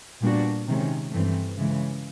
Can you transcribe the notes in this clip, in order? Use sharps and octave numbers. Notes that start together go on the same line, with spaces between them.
A#2 G3 B3 D4 F#4
C3 D#3 G#3 C#4
G2 E3 A3 C4
C#3 E3 G#3